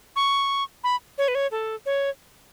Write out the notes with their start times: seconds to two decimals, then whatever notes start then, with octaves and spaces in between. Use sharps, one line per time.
0.16 C#6
0.84 B5
1.18 C#5
1.28 B4
1.35 C#5
1.51 A4
1.86 C#5